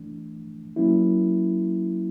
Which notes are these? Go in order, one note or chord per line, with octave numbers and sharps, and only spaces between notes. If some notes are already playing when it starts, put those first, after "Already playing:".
Already playing: E3 A3 D4
F#3 A#3 C#4 E4